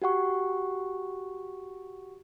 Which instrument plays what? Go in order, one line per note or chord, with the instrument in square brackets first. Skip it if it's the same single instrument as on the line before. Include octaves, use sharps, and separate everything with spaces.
[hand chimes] F#4 G4 F#5 C#6